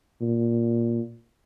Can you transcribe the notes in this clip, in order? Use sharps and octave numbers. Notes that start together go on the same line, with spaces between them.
A#2